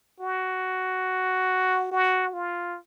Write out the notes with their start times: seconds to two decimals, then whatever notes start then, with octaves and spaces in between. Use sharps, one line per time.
0.21 F#4
1.91 F#4
2.34 F4